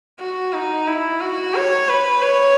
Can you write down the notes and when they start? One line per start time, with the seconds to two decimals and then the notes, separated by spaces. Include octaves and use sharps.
0.19 F#4
0.53 D#4
0.87 E4
1.21 F#4
1.55 C#5
1.88 B4
2.22 C#5